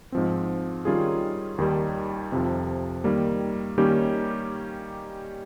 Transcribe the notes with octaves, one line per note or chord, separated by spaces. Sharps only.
G#2 F3 C4
D#3 G3 C#4 F4 G#4
D#2 D#3 G3
F2 C3 F3
D#3 G3 A#3
D#3 G3 A#3 C#4 G4